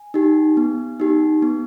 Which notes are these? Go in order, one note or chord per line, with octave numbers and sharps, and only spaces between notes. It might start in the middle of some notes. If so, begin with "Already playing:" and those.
Already playing: G#5
D#4 G4
B3
D#4 G4
B3